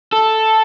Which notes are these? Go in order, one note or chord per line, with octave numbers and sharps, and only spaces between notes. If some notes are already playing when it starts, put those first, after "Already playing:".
A4